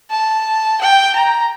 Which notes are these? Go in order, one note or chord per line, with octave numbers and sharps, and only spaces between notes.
A5
G5
A#5